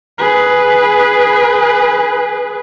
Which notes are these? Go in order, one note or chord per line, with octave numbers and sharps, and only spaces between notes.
G#4 B4